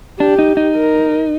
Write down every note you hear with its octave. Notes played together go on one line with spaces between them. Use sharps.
D4 G4
D#4
D#4
A#4